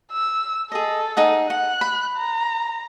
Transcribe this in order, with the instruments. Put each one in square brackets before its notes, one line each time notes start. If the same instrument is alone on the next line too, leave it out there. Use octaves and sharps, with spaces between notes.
[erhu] E6
[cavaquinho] G#4 D#5 [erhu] A4
[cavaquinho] D#4 G#4 F#5
[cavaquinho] F#5 [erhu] F#6
[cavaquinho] B5
[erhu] A#5